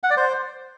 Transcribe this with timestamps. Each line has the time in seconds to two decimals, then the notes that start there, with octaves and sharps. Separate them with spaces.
0.03 F#5
0.10 D5
0.17 C5